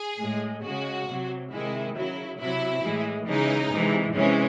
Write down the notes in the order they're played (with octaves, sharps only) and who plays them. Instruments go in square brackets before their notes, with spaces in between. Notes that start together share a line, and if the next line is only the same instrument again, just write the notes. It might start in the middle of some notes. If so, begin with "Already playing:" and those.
Already playing: [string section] G#4
A2 G#3
C#3 G#3 F#4
C3 F#3
C3 D#3 G#3 E4
C#3 F#3 E4
C3 F#3 E4
A2 E3 G#3
C#3 E3 G#3 D#4
C3 E3 G#3
C3 E3 G#3 C#4